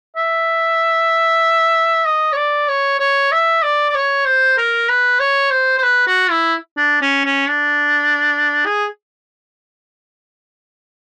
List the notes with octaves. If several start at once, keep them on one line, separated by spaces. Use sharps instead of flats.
E5
D#5
C#5
D5
C#5
C#5
E5
D5
D5
C#5
C5
A#4
B4
C#5
C5
C5
B4
F#4
E4
D4
C#4
C#4
D4
G#4